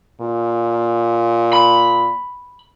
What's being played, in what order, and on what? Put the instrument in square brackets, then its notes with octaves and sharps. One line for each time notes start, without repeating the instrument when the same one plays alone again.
[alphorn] A#2
[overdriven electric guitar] B5